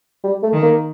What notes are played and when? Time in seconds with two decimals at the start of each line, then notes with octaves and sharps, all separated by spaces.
0.23 G3
0.43 A3
0.52 D#3
0.63 A#3